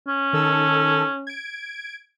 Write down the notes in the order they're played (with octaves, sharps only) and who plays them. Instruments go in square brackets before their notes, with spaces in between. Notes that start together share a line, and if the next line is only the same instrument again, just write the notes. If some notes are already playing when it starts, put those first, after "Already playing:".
[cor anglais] C#4
[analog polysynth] D#3 A4 E6
G#6 D7